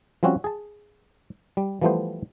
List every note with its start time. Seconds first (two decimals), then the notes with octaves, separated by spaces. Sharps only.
0.23 F3 G3 C4 C#4 F#4
0.44 G#4 A5
1.57 G3
1.81 E3 F3 G3 A3 B3 C5